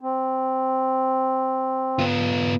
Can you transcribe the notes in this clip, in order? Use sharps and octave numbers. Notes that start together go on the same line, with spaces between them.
C4
B3 F4